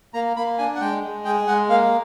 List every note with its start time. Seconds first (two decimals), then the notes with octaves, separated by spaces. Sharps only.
0.14 A#3 A#5
0.36 A#3 B5
0.58 D4 G#5
0.75 F#5
0.80 G#3 G5
1.03 G#3
1.25 G#4 G5
1.47 G#3 F#5
1.69 A#3 F5